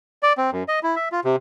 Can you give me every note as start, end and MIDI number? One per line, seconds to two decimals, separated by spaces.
0.23 0.33 74
0.38 0.50 60
0.52 0.63 42
0.68 0.79 75
0.83 0.95 64
0.96 1.09 76
1.12 1.20 65
1.25 1.36 48